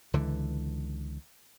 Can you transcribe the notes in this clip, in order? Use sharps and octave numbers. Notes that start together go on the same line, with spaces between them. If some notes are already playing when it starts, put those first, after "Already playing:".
C#2 D3 E3